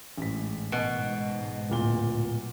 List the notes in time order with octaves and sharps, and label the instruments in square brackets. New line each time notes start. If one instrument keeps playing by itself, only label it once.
[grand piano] A1 B6 [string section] G#2
[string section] G#2 [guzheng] B2
[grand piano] D1 A#2 G7